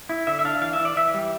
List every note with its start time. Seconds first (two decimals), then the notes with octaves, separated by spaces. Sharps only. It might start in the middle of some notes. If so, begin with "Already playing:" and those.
0.09 E4
0.27 D3 E5
0.39 E5
0.45 D4 F5
0.61 E3 F5
0.73 E5
0.79 E3
0.85 D5
0.97 E3 E5
1.14 G3